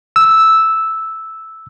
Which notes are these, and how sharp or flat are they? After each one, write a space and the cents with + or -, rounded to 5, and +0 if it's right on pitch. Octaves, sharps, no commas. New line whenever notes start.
E6 -5